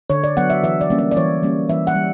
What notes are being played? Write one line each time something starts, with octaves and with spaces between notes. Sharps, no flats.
D3 C#5
D5
F#3 B3 D4 F#5
E5
E3 E5
D5
G3 A#3 C#4
D5
D5
E3 C#5
G3 A#3 C#4
E3 E5
F#5
G3